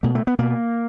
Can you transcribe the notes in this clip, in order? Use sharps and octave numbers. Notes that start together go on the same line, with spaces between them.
B2 A3
A3
B3
B2 A#3